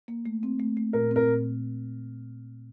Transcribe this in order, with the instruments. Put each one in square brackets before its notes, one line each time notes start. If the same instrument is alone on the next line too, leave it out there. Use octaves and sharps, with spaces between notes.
[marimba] A#3
A3
C4
A3
A3
[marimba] A#2 [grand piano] A#4
[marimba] C4 [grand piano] A#4
[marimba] A#2